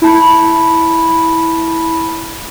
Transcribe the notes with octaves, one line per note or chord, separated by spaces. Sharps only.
E4 A5 B5